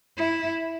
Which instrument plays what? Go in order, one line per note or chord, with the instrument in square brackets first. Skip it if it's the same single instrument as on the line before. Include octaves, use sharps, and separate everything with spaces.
[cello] E4